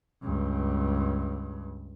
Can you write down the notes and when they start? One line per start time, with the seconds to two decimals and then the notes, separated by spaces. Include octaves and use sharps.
0.22 C#2 G2